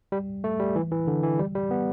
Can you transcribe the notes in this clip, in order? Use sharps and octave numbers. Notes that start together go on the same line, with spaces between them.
G3
A3
G3
E3
E3
D3
E3
G3
G3
B3